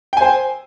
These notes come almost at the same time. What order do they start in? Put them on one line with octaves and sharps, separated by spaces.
G5 G#5 C5